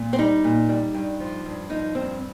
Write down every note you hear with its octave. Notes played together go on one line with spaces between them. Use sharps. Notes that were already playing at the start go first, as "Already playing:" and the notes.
Already playing: A#2
C4
G3 D#4
A#2
G3
G2
F3
G2
F3 D#4
G2 C4